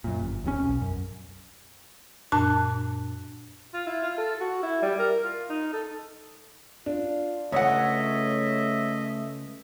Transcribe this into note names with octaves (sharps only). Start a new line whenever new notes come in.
F#2 A#2
G1
D#1 A#1 G#2 C#4
B1
F#2
F#2 A#2 D4 A5 F#6
F4
E4
F4
A4
F#4
E4
G3
A#4
F4
D#4
A4
D4 F4
C#2 A3 C#5 D#5 E5 F#5